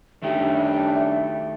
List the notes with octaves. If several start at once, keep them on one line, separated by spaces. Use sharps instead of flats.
F#2 D#3 G3 A3 D4 G4 E5